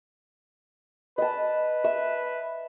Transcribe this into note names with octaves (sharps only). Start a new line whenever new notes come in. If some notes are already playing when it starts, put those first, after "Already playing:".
B4 D#5 A5
E5